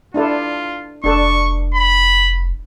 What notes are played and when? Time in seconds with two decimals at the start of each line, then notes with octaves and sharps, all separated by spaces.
0.14 D4 E4 F4 A4
1.04 F1 D4 A4 C#6
1.74 B5